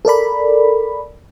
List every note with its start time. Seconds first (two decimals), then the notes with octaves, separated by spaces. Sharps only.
0.05 A4 A#4 D5 B5